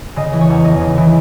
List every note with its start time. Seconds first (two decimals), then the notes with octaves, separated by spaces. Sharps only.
0.16 C#3 D#5
0.33 E3
0.40 C#5
0.49 E2
0.64 E2 D#5
0.81 C#3
0.97 E3